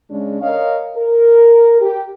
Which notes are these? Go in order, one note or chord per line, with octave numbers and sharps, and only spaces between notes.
C#3 G#3 C#4 D4
A#4 C#5 D#5 F5
A#4
G4